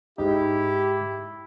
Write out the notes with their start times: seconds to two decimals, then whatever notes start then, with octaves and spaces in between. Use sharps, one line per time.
0.18 G#2 D#4 E4 G4